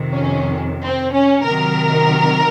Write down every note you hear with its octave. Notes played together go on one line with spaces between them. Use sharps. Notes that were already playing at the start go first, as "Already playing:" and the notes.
Already playing: F2 C3 D#3
C#4
C4
C#4
C3 D#3 F#3 A#4